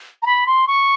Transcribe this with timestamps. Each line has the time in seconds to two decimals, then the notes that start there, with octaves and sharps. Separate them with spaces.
0.23 A#5
0.26 B5
0.47 C6
0.67 C#6